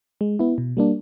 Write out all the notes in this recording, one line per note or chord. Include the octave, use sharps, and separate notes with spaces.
G#3
B3 E4
B2
G3 A#3 D4